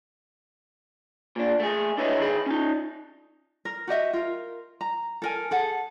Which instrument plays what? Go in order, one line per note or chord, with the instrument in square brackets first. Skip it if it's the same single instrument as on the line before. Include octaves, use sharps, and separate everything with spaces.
[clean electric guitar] A#2 D4
A3 G#4
D4 E4 A4 B4 C#5 D#5
D#3 G#4 B5
C#4 D#4
[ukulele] A#4
F#4 G4 D#5 E5
F4 A#4
A#5
A4 A#4 G#5
G#4 A4 F#5